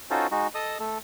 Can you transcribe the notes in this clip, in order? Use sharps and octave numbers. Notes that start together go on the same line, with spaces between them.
C#4 D#4 F4 F#4 A4 C5
G#3 D#4 F#4
A4 D#5 A5 D#6
A3 A4